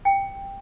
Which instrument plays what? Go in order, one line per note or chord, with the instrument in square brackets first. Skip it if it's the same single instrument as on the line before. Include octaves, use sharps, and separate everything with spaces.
[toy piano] G5